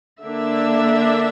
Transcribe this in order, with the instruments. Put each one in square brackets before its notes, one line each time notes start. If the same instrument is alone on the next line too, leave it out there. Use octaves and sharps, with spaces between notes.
[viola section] D3 A#3 D4 E5